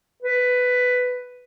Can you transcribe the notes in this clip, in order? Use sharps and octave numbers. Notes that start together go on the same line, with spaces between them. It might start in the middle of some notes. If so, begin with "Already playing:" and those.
B4